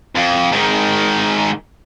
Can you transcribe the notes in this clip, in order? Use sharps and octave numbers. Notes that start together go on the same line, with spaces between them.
F2
G#2 D#3